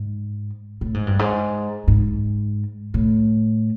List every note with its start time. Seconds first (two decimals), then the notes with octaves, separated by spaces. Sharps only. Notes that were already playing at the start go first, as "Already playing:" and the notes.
Already playing: G#2
0.81 A2
0.94 G#2
1.07 G2
1.19 G#2
1.88 G#2
2.94 A2